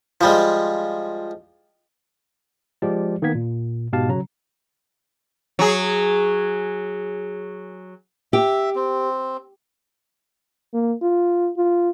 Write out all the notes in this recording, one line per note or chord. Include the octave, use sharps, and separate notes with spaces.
F3 G3 G#3
F3 G#3 G4 D5
D#3 A#3 B3 G#6 B6
A#2
G#2 B2 G4 F5 A5
C#3 F#3 C#4 A#5
F#3 G#4
G4 E5
C4
A#3
F4
F4